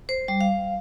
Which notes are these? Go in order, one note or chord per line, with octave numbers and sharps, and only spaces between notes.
C5
G3
F5